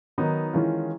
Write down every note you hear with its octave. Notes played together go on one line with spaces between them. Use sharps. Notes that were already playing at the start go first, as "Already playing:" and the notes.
D#3 F#3 B3 D#4
D#3 E3 G#3 C#4 F4